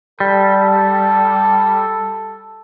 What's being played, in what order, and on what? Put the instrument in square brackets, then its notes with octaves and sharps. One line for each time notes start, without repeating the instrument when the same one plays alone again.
[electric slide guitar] G3 [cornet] A4